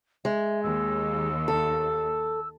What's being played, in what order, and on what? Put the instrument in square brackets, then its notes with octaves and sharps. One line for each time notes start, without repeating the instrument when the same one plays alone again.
[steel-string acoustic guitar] G#3 [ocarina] E5
[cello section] D#2 [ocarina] E6
[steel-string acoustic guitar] A4